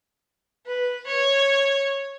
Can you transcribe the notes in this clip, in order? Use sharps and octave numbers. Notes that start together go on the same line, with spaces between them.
B4
C#5